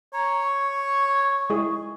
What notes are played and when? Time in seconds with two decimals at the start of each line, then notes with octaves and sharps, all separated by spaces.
0.13 C#5 A#5
0.40 C#6
1.50 G#3 E4 G#4